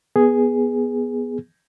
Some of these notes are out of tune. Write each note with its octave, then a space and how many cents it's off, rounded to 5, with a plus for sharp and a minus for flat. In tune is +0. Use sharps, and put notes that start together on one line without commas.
B3 -10 G#4 +0